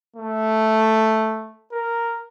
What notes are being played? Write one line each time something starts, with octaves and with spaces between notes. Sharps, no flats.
A3
A#4